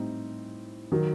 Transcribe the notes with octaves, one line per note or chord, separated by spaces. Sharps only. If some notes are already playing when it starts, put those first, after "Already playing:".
Already playing: A2 G3 C4 D#4
D#3 F#3